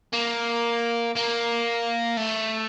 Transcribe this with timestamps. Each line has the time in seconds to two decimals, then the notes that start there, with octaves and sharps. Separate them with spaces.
0.13 A#3
1.15 A#3
2.17 A3